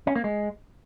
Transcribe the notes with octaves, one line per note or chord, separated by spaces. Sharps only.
C#4
A#3
G#3